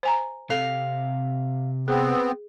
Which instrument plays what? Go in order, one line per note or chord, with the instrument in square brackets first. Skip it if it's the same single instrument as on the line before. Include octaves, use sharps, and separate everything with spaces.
[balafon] C5 G#5 A#5
[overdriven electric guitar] C3 [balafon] A4 [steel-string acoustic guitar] F5
[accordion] B3 C4 [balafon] G#4